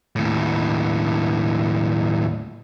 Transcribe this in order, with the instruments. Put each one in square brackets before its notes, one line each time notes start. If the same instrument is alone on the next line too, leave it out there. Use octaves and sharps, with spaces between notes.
[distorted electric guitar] D#2 A2